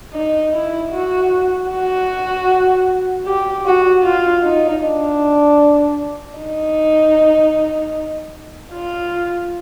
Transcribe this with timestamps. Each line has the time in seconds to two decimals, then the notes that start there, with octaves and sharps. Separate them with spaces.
0.13 D#4
0.53 E4
0.92 F#4
1.70 F#4
3.26 G4
3.65 F#4
4.03 F4
4.43 D#4
4.83 D4
6.38 D#4
8.73 F4